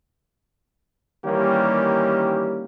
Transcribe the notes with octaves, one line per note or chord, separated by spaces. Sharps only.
D#3 E3 G3 A#3 C#4 G4